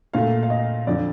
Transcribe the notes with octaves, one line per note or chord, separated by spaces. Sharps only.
A#2 A3 F5
F5
D#5
F2 D3 F3 D5